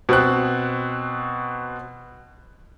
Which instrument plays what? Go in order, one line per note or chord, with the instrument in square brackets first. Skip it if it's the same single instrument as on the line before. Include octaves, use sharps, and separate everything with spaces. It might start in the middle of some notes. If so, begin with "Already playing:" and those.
[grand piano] B2 C4 F#6